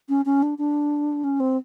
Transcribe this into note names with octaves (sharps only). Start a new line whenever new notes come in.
C#4
C#4
D4
D4
C#4
C4